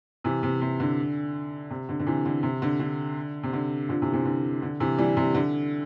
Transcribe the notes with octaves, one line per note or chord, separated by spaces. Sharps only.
C3 E3
C3
C3
D3
C3
D3
D3
C3 E3
D3
C3
D3
D3
C3
D3
D3 F3
C3 E3
C3 E3
D3
D3
C3 E3
E3 G3
C3
D3